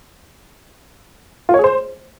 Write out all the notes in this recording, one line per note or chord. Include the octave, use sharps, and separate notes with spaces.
F4
C#5
G#4
C5